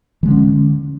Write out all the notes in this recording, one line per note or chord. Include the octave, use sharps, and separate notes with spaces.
D3 E3 G#3 C#4